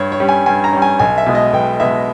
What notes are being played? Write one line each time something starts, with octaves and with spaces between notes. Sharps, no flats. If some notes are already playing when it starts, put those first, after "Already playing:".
Already playing: G2 C#5
C#5
G3 C#4
G#5
G2 G#5
A#5
G3 C#4
G#5
B1 G#5
E5
B2 G#3
D#5
B1 G5
B2 G#3 E5